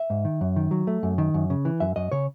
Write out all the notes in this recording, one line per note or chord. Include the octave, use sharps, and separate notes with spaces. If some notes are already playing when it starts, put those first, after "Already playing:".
Already playing: E5
G#2
D#3
F#2
D#3
F#3
A3
F#2
D#3
F#2
C#3
E3
F#2 E5
F#2 D#5
C#3 C#5